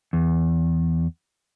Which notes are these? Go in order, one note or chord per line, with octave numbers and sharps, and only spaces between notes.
E2